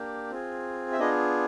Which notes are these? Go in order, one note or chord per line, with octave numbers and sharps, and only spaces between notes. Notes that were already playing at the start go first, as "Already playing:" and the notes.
Already playing: A#3 D4 G4
C4 F4 G#4
E5
B3 D4 F4 G#4 D#5